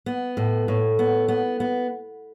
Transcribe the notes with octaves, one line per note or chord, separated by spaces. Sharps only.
B3
A2
A2
B3
B3
B3